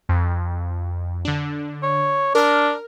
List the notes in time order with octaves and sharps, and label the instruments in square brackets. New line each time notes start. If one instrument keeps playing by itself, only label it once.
[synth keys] F2
D3 D4
[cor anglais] C#5
[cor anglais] D4 [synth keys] A#4 F6